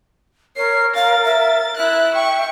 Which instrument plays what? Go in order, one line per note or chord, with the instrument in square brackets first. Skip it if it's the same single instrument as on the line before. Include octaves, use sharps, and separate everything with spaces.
[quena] A#4 [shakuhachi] C#5 [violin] C7
[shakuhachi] F5 [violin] A6
[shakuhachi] E5
[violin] E4 F#6 [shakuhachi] E5
[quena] G5 [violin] C#6